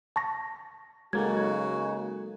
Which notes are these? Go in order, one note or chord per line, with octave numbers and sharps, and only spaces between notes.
A5 C#6 A#6
C#3 F#3 G#3 A#3 D#4 F#4 A4 G#6